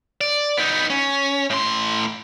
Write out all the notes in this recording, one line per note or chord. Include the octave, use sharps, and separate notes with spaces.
D5
B3 D#4
C#4
A2 C6